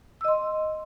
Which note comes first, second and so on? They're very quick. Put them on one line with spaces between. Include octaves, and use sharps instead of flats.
E6 D#5 C6